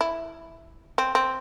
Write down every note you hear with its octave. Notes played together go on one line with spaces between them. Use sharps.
E4
C4
C4